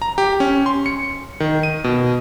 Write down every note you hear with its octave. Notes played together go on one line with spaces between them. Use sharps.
A#5
G4
C#4
C6
C#7
D#3
D#7
B2